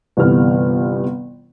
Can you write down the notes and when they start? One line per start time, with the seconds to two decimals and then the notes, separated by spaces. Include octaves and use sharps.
0.17 G1 C3 E3 B3 F6